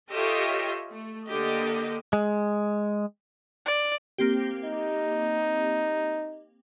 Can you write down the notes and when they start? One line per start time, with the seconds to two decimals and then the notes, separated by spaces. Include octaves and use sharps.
0.11 F4 G4 A4 C#5 D#5 E5
0.91 A3
1.28 D3 A#3 G4 D#5
2.13 G#3
3.66 D5
4.18 A#3 C4 G4
4.65 D#4